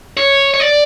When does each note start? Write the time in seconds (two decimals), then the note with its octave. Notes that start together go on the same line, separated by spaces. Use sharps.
0.17 C#5
0.54 C#5
0.60 D5